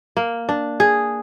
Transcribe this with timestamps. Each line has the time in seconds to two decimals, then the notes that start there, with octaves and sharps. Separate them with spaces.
0.17 A#3
0.49 D4
0.80 G#4